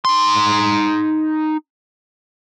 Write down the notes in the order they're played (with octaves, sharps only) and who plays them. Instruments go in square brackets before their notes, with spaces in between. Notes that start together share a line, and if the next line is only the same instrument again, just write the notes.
[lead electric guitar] D#4 C6